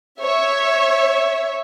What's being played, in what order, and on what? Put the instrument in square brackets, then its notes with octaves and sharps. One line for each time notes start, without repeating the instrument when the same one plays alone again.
[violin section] C#5 E5